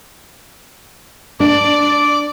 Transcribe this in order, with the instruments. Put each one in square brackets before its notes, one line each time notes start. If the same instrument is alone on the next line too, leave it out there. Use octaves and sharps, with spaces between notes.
[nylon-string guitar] D4 [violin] D5 [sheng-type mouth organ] D6